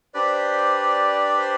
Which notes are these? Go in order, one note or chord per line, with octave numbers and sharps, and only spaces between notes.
D4 G4 B4 C5 D5
C5